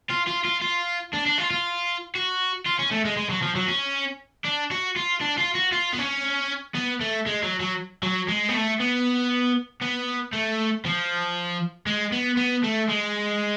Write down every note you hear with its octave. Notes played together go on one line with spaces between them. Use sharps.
F4
F4
F4
F4
D4
D4
F4
F4
F#4
F4
C#4
A3
G#3
G#3
F#3
F3
F#3
C#4
D4
F#4
F4
D4
F4
F#4
F4
B3
C#4
B3
A3
G#3
F#3
F#3
F#3
G#3
B3
A3
B3
B3
A3
F3
G#3
B3
B3
A3
G#3